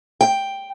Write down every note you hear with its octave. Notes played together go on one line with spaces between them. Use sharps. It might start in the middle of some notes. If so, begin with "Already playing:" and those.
G5